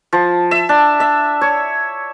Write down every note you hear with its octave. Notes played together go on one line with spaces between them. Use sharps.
F3
E5
D4
E5
C#5